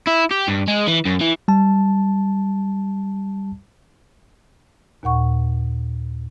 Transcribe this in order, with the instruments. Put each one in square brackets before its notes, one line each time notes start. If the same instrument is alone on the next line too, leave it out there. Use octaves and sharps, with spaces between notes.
[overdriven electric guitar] E4
G4
G2
G#3
E3
F#2
E3
[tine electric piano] G3 A5
[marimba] D#2 A#2 F#5 C#6